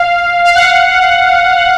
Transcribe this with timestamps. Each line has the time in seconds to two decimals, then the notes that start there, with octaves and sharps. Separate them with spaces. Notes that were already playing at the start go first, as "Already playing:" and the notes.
Already playing: F5
0.45 F5
0.55 F#5
0.65 F5